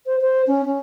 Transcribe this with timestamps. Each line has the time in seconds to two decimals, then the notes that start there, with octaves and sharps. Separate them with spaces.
0.06 C5
0.21 C5
0.47 C#4
0.65 C#4